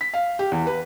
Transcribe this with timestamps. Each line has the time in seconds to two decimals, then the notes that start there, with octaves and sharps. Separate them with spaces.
0.01 B6
0.13 F5
0.39 G4
0.52 E2
0.67 B4